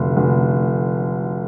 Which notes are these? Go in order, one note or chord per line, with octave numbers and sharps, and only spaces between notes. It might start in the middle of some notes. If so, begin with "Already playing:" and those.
Already playing: F1 D3
F1